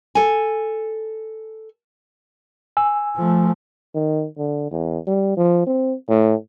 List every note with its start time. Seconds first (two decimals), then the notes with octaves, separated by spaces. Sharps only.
0.15 A4 G#5
2.77 G#5 E6
3.16 F3 A3
3.95 D#3
4.38 D3
4.71 E2
5.07 G3
5.37 F3
5.67 C4
6.09 A2